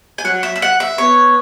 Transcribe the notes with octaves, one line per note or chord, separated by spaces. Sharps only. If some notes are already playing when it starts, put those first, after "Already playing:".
G#5
F#3 F#5
E5
E5
F#5
E5
B3 C#5